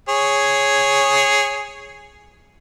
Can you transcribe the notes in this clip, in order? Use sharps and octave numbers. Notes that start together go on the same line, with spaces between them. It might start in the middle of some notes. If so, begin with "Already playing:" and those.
G#4 C#5